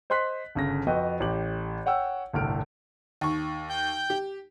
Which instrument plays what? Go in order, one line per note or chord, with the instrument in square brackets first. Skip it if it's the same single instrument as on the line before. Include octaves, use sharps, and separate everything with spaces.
[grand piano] C5 D#5 C6 F#6 B6
G1 C#3 A#6
F2 F#4 B4 D#5 G5
A1 G4 F#7
C#5 F#5 G5 E6
G1 C2 A2 F6 D7
[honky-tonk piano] D#2 C#6
[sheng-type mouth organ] G5 G6
[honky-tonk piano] G4